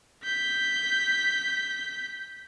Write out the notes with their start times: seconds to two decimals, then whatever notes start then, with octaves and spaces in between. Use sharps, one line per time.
0.24 G6 B6